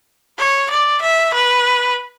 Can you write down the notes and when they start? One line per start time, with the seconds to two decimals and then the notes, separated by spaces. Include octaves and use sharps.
0.38 C#5
0.70 D5
1.02 E5
1.34 B4